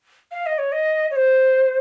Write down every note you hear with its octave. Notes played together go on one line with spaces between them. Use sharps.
F5
D#5
C#5
D#5
C#5
C5